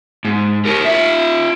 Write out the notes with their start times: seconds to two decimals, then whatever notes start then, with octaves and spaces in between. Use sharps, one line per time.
0.25 G#2
0.65 G4 A#4
0.85 F4 E5